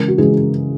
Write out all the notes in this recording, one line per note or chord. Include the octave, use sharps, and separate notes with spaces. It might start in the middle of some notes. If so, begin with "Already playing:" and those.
Already playing: C#3 E3 G#3 A#4
F#4
C#3 E3 G#3 G#4